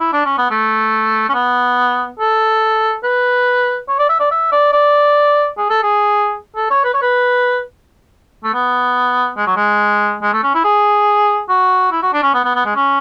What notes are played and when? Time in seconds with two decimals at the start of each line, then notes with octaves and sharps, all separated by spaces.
0.00 E4
0.13 D4
0.25 C#4
0.38 B3
0.51 A3
1.29 C#4
1.34 B3
2.19 A4
3.03 B4
3.88 C#5
3.99 D5
4.09 E5
4.20 D5
4.31 E5
4.52 D5
4.73 D5
5.58 G#4
5.70 A4
5.83 G#4
6.56 A4
6.70 C#5
6.84 B4
6.93 C#5
7.02 B4
8.44 A3
8.54 B3
9.37 G#3
9.47 F#3
9.56 G#3
10.22 G#3
10.33 A3
10.43 C#4
10.55 E4
10.64 G#4
11.49 F#4
11.92 E4
12.02 F#4
12.13 D4
12.23 C#4
12.34 B3
12.45 B3
12.55 B3
12.65 G#3
12.75 C#4